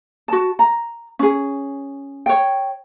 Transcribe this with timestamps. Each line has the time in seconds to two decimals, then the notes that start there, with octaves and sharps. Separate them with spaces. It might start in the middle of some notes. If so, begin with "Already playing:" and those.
0.28 F#4 A5
0.59 A#5
1.19 C#4 G#4
2.26 C#5 G5